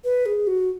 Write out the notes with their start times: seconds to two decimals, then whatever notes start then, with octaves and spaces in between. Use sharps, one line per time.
0.04 B4
0.26 G#4
0.47 F#4